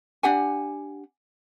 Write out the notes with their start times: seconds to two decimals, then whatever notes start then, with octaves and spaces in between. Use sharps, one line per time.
0.23 D4 G4 F#5 G#5